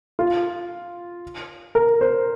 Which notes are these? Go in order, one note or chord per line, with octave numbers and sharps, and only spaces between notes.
F4
A#4
C5